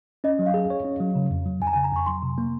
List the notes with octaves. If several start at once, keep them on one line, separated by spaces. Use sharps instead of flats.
C#4 D#5
F#3
F5
G#4
C#5
C#4
F#3
C#3
F2
F#3
F2 G#5
A#5
C#3 G#5
A#5
F2 C#6
F#3 C6
C3
A#3